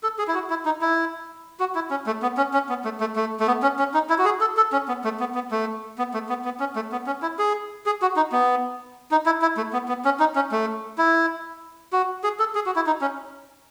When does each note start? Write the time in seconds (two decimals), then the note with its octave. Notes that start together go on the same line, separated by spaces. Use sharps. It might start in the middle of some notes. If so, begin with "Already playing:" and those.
0.03 A4
0.19 G#4
0.28 E4
0.34 F#4
0.50 E4
0.65 D#4
0.81 E4
1.60 F#4
1.75 E4
1.91 C#4
2.07 A3
2.22 B3
2.37 C#4
2.54 C#4
2.69 B3
2.85 A3
3.00 A3
3.16 A3
3.40 A3
3.47 B3
3.63 C#4
3.79 C#4
3.94 D#4
4.10 E4
4.18 F#4
4.25 G#4
4.41 A4
4.57 A4
4.72 C#4
4.88 B3
5.04 A3
5.20 B3
5.35 B3
5.51 A3
5.98 B3
6.14 A3
6.29 B3
6.45 B3
6.60 C#4
6.76 A3
6.92 B3
7.07 C#4
7.22 E4
7.39 G#4
7.86 G#4
8.02 F#4
8.16 D#4
8.32 B3
9.11 D#4
9.26 E4
9.42 E4
9.57 A3
9.73 B3
9.88 B3
10.05 C#4
10.20 D#4
10.36 C#4
10.52 A3
10.98 E4
11.93 F#4
12.24 G#4
12.39 A4
12.55 G#4
12.66 F#4
12.76 E4
12.86 D#4
13.01 C#4